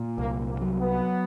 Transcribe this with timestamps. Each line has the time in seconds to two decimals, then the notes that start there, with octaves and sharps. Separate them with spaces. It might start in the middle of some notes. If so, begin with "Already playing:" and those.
Already playing: A#2
0.17 C2 A#3
0.47 A#3
0.61 F#3
0.77 B3